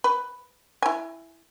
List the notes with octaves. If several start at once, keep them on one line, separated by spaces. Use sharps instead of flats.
B4
E4 G#5